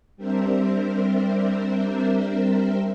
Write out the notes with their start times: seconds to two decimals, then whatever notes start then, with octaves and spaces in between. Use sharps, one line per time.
0.17 G3 C4 D4 A#4 C5 E5